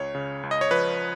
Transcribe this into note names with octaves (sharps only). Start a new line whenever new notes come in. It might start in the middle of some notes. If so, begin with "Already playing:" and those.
Already playing: C#2 C#5
C#3
C#2
D#5
C#5
F3 B4